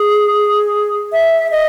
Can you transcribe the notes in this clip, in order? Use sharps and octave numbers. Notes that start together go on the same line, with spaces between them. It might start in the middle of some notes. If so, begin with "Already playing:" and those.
Already playing: G#4
E5
D#5